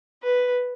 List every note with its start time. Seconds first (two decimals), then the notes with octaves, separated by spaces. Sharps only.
0.23 B4